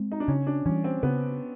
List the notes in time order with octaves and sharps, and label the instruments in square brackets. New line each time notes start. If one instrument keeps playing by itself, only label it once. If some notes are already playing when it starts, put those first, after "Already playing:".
Already playing: [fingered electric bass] G#3 C4
[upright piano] D#4
D4
[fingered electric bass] C#3 [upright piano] C#4
[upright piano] D4
[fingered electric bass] E3 G3 [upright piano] C#4
[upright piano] C4
[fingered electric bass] C#3 [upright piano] B3